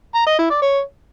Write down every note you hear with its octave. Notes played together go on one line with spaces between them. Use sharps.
A#5
D#5
E4
D5
C#5